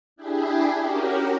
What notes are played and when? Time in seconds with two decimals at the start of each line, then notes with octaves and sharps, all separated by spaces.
0.16 D4 E4 G4 G#4
0.79 C#4 F#4 G4 A#4